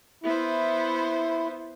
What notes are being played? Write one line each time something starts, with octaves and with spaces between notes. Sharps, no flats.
B3 E4 C5